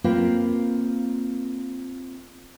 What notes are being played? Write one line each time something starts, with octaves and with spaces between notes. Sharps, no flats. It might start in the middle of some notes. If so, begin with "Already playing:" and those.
A#3 C4 F4 A#4 B4